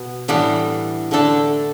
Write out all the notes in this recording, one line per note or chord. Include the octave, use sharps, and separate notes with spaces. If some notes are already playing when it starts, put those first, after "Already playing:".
Already playing: B2 B3
A2 E3 G3 B3 D4
D3 A3 D4 A4